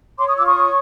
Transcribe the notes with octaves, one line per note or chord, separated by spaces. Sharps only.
C#5 C6 D6
C#6 D#6
F4 D6 E6
C#6 D#6
C#5